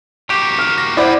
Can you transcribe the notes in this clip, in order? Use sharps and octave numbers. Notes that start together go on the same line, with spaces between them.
A#3 F#4 G4
F6
A#6
F#2 E4 B4 C5 D5 F#5